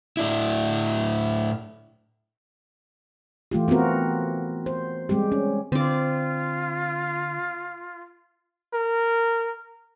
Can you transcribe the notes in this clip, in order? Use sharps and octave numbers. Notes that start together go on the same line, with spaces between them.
A2 D4 E4
E3 A3 F4 G4
B3 C4 F4 F#4 A#4
C5
G3 G#3 C4 G4
C#4
D3 C4 F4 D5
A#4